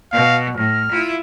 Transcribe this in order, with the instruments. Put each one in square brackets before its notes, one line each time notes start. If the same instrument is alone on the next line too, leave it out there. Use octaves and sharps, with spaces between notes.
[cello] B2 [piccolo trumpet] F5
[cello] A2 [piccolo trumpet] F6
[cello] E4 F4